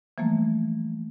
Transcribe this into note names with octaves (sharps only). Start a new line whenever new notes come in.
E3 F3 G3 A3 A#3